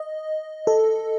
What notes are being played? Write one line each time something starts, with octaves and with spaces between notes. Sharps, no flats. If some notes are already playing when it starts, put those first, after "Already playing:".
Already playing: D#5
A4